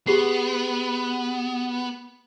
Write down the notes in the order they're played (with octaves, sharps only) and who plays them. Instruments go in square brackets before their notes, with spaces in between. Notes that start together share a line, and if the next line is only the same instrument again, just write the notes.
[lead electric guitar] B3 [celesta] G4 G#4 C7